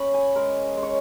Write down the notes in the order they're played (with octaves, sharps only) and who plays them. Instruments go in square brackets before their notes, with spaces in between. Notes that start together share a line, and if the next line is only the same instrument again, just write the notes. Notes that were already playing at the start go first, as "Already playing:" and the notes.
Already playing: [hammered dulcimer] C#4 B5 C#6
G#5
G#3 A#4
G#3
C#5